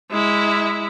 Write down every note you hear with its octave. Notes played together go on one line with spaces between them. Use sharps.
G#3 E4